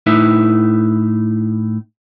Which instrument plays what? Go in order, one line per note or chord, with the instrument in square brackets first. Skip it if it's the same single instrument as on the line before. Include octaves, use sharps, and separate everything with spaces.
[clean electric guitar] A2 D#4 E4 B4 E5